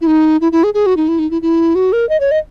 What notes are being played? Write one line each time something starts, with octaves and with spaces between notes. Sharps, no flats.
E4
D#4
E4
E4
G#4
G#4
F#4
D#4
E4
D#4
E4
E4
F#4
A#4
D#5
C#5
D#5